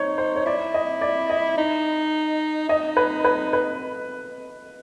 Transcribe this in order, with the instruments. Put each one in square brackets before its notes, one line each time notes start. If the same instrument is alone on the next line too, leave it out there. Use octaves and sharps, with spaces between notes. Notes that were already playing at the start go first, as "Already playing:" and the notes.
Already playing: [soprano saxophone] D#4 [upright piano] C5 C#5
[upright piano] C5
C#5
[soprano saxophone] E4 [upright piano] D5
[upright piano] D#5
D5
D#5
[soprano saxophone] D#4
[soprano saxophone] D#4 [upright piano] D#5
[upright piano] B4
B4
B4